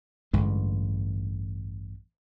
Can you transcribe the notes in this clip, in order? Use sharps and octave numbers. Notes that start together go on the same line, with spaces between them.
A1 G2 D3 G#3